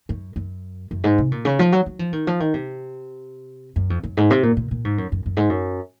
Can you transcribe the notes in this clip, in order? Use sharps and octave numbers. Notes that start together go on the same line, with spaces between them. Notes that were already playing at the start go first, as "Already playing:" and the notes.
F#2
F#2
F#2
G#2
C3
A#2
C#3
F3
F#3
F#3
F3
D#3
F3
D#3
C3
F#2
F2
F#2
G#2
C3
A#2
A#2
A#2
G#2
F#2
F#2
F#2
G#2
F#2